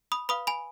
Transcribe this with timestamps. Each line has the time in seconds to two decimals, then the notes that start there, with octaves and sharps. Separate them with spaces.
0.12 B5 D#6
0.29 B4 F5 B5 D#6
0.47 G#5 B5